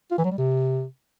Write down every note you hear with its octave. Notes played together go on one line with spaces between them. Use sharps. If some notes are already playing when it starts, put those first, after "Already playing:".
F4
E3
F#3
G3
C3